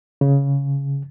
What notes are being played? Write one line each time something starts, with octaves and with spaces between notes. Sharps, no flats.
C#3